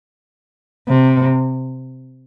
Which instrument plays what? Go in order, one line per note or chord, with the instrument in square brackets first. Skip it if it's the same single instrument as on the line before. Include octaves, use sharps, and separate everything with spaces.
[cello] C3